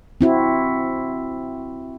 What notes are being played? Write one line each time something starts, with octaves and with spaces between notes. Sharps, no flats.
C4 E4 F#4